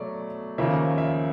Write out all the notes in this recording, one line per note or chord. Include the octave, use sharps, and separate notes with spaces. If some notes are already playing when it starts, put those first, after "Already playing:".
Already playing: B2 F#3 A3 D5
D#2 C#3 F3 A#3 E5
E5